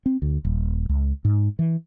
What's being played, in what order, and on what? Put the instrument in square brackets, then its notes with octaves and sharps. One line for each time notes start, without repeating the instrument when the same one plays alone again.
[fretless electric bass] C4
D2
D#1
C#2
G#2
E3